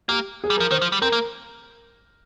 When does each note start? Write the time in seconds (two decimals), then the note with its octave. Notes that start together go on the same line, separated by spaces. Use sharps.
0.08 A#3 G4
0.44 G#4
0.50 G3
0.57 F3 A#4
0.71 D#3 C5
0.82 F3
0.92 G3
1.02 C4 A#4
1.12 A#3